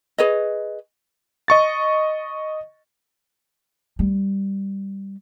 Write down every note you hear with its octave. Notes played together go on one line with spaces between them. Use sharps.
G#4 B4 C#5 D#5
D#5 C#6 A6
G3